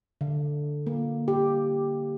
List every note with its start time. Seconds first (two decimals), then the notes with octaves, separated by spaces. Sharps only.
0.21 D3
0.87 A#3
1.28 G4